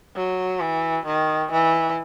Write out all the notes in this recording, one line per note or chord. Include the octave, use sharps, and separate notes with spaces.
F#3
E3
D#3
E3